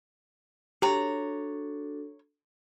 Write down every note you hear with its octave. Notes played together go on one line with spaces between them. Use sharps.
D4 F#4 G4 A4 C#5 A#5